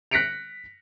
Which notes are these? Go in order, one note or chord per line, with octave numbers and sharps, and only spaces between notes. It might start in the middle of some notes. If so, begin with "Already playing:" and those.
F#6 A#6 B6 C#7 D7 F7